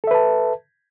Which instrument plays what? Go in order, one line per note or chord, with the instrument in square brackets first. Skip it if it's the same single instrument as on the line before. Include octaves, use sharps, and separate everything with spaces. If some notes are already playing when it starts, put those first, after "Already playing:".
[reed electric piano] A4
E5
B4
A5